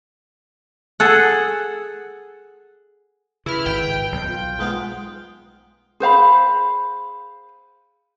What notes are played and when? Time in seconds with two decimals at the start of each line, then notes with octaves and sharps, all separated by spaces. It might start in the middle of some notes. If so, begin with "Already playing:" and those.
1.00 G#4 A4 F#5
3.46 C#3 E4 B4 F6
3.66 G#1 G5
4.12 B1
4.28 F4
4.59 G#2 B3 F5
6.00 G#4 C5 F5 B5